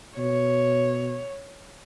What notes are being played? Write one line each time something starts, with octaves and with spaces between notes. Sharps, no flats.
B2 C#5